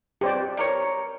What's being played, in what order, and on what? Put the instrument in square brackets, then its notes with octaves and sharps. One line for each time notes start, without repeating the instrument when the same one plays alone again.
[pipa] B2 [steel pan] G4 C5 D5
[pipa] G3 A#4 C#5